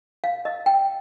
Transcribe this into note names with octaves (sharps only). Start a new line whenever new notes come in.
F5
D#5
G5